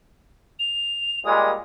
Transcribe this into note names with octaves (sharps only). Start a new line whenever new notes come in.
F7
A#2 G3 G#3 D#6